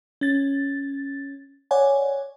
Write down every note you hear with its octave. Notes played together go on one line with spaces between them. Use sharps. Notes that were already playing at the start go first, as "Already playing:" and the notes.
C#4 A6
C#5 D5 F#5 G#5